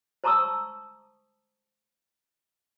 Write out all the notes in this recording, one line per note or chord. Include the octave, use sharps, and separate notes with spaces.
C5 A5 A#5 C#6 D#6 E6